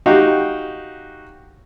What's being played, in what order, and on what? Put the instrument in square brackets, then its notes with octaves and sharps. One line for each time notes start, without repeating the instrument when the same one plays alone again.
[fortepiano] D#4 F#4 G4 F5